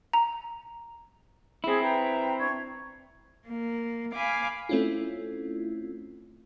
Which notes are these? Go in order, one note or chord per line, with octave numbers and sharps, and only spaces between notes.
A#5
C4 E4 G#4 E5
B4 G5 A#5
D4 C#6 G#6
A#3
F5 G#5 B5 D6
A3 C4 C#4 E4 F4